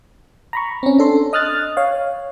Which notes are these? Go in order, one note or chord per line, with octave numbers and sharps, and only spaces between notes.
A#5 B5 C#6
C4 C#4
D4 A4 C6
D#5 D#6 F6 F#6 A6
C#5 F5